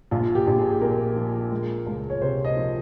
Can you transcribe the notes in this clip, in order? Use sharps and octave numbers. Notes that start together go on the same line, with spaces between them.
A#1 F4
G4
A#1
G#4
A#2 A#4
F3
G#3
C#2
C#5
C3 C5
D#5
F3